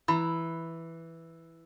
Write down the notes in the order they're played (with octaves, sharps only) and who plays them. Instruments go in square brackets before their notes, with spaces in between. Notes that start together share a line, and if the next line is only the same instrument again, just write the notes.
[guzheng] E3 [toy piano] E4 B5 E6